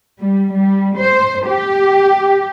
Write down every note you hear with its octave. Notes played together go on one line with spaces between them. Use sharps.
G3
G3
C5
G4